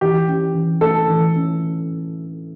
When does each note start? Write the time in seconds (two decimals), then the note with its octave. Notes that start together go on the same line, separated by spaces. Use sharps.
0.01 E3 G4
0.28 C#4
0.54 E3
0.81 A3 A4
1.08 E3
1.35 C#4